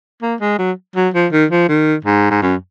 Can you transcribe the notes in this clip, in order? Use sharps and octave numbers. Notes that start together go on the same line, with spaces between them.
A#3
G#3
F#3
F#3
F3
D#3
F3
D#3
G#2
G#2
F#2